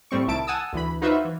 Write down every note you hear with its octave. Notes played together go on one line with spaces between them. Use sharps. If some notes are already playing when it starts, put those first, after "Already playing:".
A2 G3 C4 C#6
C2 D#3 E4 A5 D7
F#5 G#5 A5 D#6 E6
D2 E3 B5
D#4 F4 F#4 B4 C5 E5
E3